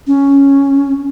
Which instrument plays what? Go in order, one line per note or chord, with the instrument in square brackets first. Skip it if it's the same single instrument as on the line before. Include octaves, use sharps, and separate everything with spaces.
[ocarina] C#4